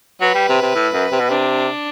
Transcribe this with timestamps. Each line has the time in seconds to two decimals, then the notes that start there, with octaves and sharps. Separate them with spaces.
0.21 F#3 B4
0.35 G3
0.49 C3
0.62 C3
0.75 A2
0.93 F#2
1.12 C3
1.20 B2
1.29 C3 D4